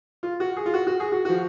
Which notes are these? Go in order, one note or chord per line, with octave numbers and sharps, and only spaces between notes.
F4
F#4
G#4
F4
F#4
F#4
G#4
F#4
F3 F#4